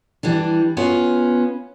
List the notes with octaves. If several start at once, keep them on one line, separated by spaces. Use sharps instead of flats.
E3 G3 D4
B3 C#4 F4